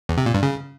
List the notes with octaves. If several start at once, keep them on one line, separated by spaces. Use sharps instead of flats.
E2
C3
A#2
G2
C#3